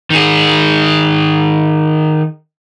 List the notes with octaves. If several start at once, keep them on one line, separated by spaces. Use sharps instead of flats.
D#3 G#4